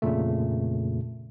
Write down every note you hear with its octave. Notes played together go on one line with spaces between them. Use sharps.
F2 A#2 C#3 A3